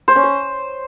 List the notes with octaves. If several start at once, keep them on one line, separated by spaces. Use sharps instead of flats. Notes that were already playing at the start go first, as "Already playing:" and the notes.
C5
C#4
C5